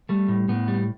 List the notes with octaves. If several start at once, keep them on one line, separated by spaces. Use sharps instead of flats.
G3 A3
A2
A2 B3
G3